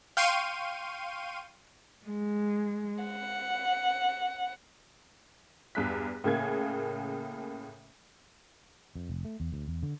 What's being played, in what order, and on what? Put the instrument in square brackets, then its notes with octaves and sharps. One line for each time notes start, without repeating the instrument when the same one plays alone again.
[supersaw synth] F5 G5 C6 C#6 D#7
[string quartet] G#3
F#5
[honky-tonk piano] E2 G2 F#6 B6
A2 C#3 A#3 G#4 G#6
[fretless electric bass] F2
F1
A3
E2
D2
E2
D3